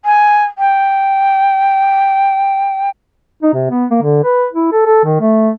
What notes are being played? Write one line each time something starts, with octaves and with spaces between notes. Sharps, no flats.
G#5
G5
D#4
C3
B3
A#3
D3
B4
E4
A4
A4
D#3
A3